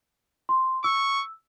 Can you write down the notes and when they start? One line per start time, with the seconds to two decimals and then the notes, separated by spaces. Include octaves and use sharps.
0.49 C6
0.84 C#6 E6